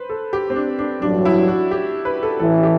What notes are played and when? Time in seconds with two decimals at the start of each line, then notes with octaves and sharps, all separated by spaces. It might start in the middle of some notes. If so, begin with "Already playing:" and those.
Already playing: B4 C5
0.10 A4
0.33 G4
0.50 C4
0.56 D4
0.79 D4
1.02 A1 G2 F#3 D4
1.25 E4
1.48 F#4
1.71 G4
2.05 B4
2.23 A4
2.39 A1 A2 E3 A4
2.63 G4